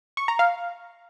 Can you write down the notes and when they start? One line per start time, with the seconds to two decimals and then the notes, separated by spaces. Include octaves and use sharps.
0.17 C#6
0.28 A#5
0.39 F5